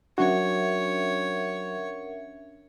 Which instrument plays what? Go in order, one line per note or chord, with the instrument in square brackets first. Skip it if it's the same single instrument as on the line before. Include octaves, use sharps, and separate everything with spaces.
[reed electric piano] F#3 F#4 [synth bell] C#4 D4 [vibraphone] A#4 E5 F#5 [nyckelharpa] C#5